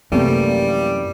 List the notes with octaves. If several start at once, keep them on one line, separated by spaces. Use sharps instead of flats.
F#2 C3 E3 G3 A3 A#3